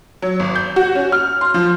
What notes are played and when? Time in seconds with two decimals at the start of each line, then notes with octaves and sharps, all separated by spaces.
0.22 F#3
0.40 G#1
0.56 G6
0.76 F#4
0.95 C#4
1.12 F6
1.41 C6
1.54 F3